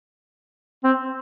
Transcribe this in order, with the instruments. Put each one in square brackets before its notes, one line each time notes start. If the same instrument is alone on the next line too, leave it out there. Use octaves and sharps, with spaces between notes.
[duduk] C4